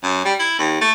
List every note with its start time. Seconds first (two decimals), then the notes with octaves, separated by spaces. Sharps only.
0.03 F#2
0.25 G3
0.39 E4
0.59 D#2
0.81 A3